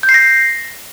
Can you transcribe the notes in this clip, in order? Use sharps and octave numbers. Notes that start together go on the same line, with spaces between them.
G6
C7
A#6